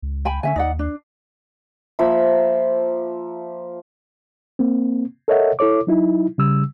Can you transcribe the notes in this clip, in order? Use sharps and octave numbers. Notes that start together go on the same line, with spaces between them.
C#2
G5 G#5 B5
D3 C#4 E5 G#5
D#2 D#4 D5 F#5
D4
F3 A#3 E5 B5
A#3 C4
A4 A#4 C#5 D#5 E5 F#5
E4 A4 C#5 D6
F#3 D#4 E4
C#3 G3 E6